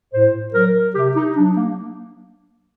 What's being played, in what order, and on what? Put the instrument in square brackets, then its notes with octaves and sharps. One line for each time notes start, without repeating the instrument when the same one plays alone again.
[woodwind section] A2 C5
F#3 A#4
C3 G4
D#4
F#3 D4
A#3